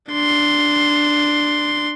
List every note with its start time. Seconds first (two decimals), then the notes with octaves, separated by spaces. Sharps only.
0.11 D4 C6